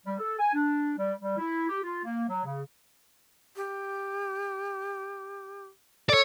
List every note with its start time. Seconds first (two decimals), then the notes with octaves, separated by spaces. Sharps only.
0.06 G3
0.19 A4
0.39 G#5
0.54 D4
0.97 G3
1.21 G3
1.38 E4
1.69 G4
1.83 F4
2.05 A#3
2.29 F#3
2.45 C#3
3.56 G4
6.09 A4 C#5 D5